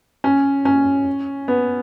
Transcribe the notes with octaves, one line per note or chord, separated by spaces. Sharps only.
C#4
C#4
B3